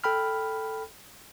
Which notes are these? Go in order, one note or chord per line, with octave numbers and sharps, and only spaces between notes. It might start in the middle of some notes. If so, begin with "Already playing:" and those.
A4 G5 B5 F6